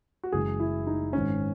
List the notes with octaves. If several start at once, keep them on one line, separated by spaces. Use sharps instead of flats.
F#4
F#1 F#2 C#3 E3 G#3 G#4
E4
D#4
G#1 G#2 D#3 C#4